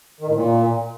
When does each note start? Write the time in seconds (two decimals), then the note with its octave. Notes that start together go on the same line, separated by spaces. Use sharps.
0.20 D#3
0.27 A2
0.34 A#2